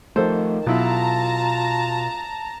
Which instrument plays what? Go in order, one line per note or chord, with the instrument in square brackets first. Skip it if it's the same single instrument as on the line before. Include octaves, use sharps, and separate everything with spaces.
[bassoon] D#3 [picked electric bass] F3 A3 [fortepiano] A4 C5
[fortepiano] B1 E4 [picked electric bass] B2 [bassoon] F4 [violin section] A5 A#5